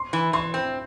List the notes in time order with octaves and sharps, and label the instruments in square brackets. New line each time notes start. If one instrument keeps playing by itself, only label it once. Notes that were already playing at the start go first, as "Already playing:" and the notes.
Already playing: [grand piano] C6
[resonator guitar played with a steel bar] E3
[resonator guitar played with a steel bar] E3 [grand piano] C6
[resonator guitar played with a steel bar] C4